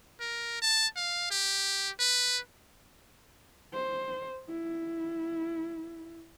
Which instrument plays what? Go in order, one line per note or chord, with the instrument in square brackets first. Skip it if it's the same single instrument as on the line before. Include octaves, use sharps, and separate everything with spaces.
[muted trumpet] A#4
A5
F5
G4
B4
[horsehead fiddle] C5
E4